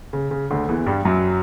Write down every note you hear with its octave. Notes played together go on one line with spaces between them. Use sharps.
C#3
C#3
D2 D3
E2 E3
G2 G3
F#2 F#3